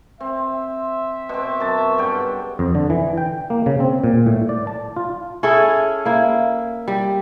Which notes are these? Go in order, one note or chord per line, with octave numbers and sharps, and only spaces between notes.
C4 E5
B2 C4
F#2 A5
G2 C#3 F#5 G5
F2
D3
E3
G5
A#3
C#3
C4
A#2
A2
D5
A5
F4
C#4 E4 G#4 A4
A#3 E4
G3